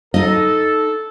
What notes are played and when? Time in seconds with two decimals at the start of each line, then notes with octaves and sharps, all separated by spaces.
0.14 D#4 A4 D#5